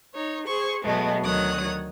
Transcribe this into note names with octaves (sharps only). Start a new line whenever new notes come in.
D#4 C#5
G#4 C5 C#6
B2 F#3 G#3 A3 B3
D2 D#3 F#3 C#5 D#6 F#6